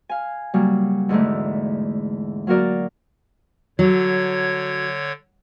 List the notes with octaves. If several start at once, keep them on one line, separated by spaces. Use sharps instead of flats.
F5 G#5
C#3 F#3 G3 A#3
E2 G#2 D3 A3
F#3 A#3 F#4 A#4 D5
D3 F#3 C#5 G#6